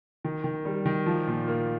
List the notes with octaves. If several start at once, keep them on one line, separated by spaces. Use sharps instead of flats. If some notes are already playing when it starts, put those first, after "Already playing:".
D#3
D#3
G3
D#3
F3
A#2
A#3